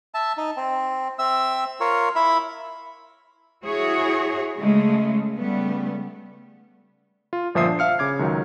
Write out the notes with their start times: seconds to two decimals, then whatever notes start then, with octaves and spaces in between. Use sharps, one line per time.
0.14 E5 A5
0.38 D#4
0.57 C4
1.19 C4 E5 E6
1.80 F4 A#4 C#5
2.16 E4 E5 B5
3.65 E4 F#4 G#4 C#5
4.59 C#3 G#3 A3
5.36 C#3 G3 A3 B3
7.33 F4
7.55 G1 A#2 F3 E5 D#6 C7
7.66 D4
7.79 E5 F5 F6 C#7
7.99 C#3 D6 G#6
8.19 C#2 D#3 F#3